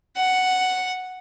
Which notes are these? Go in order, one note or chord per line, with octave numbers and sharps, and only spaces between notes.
F#5